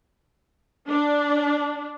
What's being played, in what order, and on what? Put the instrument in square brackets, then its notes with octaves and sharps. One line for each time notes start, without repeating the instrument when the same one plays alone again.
[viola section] D4